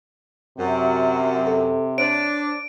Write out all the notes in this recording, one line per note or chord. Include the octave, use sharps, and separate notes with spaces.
F#2 C3
A4
D4 C5 C#5 D7